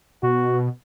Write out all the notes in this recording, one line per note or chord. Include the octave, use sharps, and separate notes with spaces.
B2 F#4